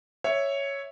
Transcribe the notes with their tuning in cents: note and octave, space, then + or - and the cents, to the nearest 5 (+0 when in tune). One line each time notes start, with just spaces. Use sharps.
C#5 +0 E5 +0